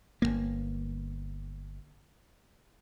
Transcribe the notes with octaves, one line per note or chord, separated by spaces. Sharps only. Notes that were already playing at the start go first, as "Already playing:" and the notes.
G1 F#2 A#3